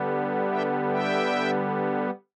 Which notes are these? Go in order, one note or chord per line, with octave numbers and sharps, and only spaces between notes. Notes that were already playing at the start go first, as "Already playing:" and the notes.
Already playing: D3 G3 B3
E5 G5
E5 G5